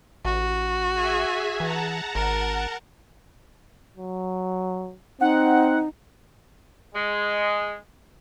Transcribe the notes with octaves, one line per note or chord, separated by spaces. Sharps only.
A1 F#4
G#4 E5 G#5
E3 F#5 A5 A#5
G#1 A#4
F#3
C4 D#4 F#5
G#3